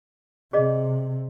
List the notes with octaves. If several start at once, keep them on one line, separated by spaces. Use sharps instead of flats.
C3 G#4 D5 D#5